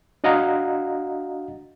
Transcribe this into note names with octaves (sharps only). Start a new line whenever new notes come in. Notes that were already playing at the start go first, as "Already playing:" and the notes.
D4 F#4 D#5 F5 F#5 A#5